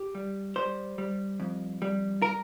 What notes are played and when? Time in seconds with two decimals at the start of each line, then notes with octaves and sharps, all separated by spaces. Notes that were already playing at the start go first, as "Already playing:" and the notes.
Already playing: G4
0.15 G3
0.56 G3 C5
0.98 G3
1.40 F2
1.82 G3
2.22 A#4